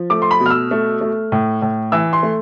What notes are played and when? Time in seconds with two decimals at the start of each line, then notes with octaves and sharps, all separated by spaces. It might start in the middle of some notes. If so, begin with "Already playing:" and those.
Already playing: F3
0.10 A3 D6
0.22 C6
0.31 B5
0.40 B2
0.46 F6
0.50 E6
0.71 A3
1.01 A3
1.32 A2
1.62 A2
1.92 E3 E6
2.13 C6
2.23 A3